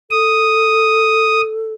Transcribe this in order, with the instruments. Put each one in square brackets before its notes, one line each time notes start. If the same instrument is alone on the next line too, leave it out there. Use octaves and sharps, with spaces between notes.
[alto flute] A4 [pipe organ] D#6